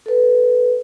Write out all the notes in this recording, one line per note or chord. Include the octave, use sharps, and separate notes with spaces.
A4 B4